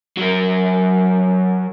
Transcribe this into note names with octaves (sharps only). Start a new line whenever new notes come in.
F#3 A#4